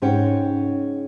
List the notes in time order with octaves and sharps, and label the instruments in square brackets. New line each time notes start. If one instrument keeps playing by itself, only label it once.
[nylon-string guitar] G#2 C#3 C#4 C#5 F#5 G5